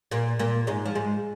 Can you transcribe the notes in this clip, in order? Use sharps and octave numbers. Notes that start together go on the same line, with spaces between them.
A#2 A#3
A#2 A#3
G#2 G#3
F3
G#2 G#3